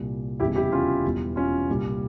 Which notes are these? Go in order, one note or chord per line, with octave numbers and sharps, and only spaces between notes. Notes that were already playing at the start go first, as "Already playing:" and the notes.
Already playing: C2 A#2 G3
F1 E2 C#3 G3 E4 G4
E4 G4
C#4 F4
E1 E2 E3 G3
C#4 F4
C2 A#2 G3